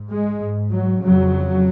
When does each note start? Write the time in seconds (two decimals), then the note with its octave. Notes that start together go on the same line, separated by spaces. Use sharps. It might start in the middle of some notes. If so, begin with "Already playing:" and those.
Already playing: G#2
0.10 G#3
0.40 G#2
0.71 F#3
1.00 C#3 F#3
1.05 F2